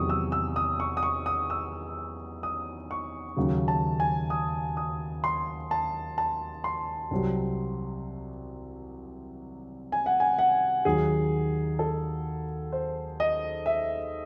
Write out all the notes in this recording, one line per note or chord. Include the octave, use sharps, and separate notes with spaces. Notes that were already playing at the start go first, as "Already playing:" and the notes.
Already playing: E2 C3 D#3 F#3 C#6 D#6
E6
E6
D#6
C#6
D#6
C#6
D#6
E6
D#6
C#6
D#2 C#3 F#3
A5
G#5
D#6
D#6
C6
A5
A5
C6
C2 C3 F#3
G#5
F#5
G#5
F#5
D#2 D#3 F#3 G#4
A4
C5
D#5
E5